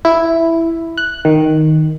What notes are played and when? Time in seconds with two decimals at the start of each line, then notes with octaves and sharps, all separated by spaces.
0.05 E4
0.97 F#6
1.25 D#3